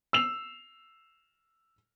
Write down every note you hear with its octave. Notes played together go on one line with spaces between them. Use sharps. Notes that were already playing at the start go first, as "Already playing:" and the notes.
E6 C7 E7 F7